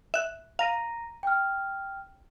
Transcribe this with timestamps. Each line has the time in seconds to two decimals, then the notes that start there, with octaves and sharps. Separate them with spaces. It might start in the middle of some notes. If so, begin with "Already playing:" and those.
0.14 E5 F#6
0.59 F5 A#5 A#6 D#7
1.23 G5 F6